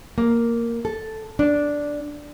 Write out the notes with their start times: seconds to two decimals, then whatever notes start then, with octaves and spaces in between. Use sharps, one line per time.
0.18 A#3
0.85 A4
1.39 D4